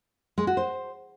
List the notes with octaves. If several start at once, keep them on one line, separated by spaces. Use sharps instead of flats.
G#3
F#4
C5